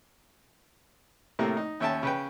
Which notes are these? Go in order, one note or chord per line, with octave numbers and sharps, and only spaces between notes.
A2 C3 A3 A#3
D#4
D#2 C#4 E5 G5 A5
C#3 B4 G5